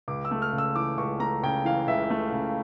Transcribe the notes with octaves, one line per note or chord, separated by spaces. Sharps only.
C#2 D6
E6
A3
F6
C#3
E6
E3 D6
C#2 C#6
A3 A#5
C#3 G5
E3 F5
C#2 E5
A3 E5
C#3